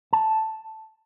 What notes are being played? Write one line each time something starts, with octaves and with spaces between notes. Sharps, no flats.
A5